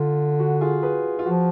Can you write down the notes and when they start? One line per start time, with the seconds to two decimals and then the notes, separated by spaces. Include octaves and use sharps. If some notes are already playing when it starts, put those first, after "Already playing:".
Already playing: D3 F4
0.40 F#4
0.61 F4 G#4
0.83 G#4 B4
1.19 F4
1.26 F3 F#4